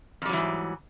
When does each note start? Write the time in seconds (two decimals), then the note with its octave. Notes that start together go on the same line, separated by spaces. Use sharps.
0.22 F2
0.25 G3
0.29 F#3
0.33 E3
0.37 G#2